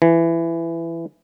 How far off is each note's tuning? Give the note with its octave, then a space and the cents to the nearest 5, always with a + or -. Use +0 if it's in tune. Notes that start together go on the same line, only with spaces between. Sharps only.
E3 +15